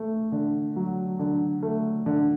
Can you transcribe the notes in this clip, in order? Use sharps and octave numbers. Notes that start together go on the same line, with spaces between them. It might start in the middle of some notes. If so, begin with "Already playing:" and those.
Already playing: A3
D3
F#3
D3
A3
D3